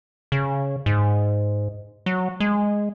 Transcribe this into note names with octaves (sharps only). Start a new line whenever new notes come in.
C#3
G#2
F#3
G#3